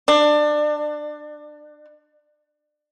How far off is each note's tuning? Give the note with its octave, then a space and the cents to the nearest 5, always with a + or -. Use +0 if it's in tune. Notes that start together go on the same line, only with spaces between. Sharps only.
D4 +25